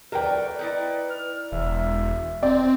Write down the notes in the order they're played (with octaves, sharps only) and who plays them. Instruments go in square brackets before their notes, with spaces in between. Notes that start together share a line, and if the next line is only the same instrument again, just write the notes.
[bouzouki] F#3 A3 D5 [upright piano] A#4 G5 [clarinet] B4
[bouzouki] D#4 E4 D5
[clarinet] F6
[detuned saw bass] E1 [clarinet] E5
[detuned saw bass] C4 [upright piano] D5